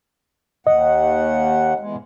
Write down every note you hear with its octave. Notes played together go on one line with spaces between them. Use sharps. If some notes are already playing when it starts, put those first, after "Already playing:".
D#2 D#5 F#5
E2 G#3